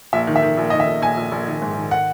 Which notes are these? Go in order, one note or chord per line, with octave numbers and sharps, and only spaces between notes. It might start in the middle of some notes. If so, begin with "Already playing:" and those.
A#1 E5
D#3
E5
D#3
A#1
D#3 D#5
E5
A#1
A#1 G#5
A#1
A#1
D#3
G#2
D#3
F#5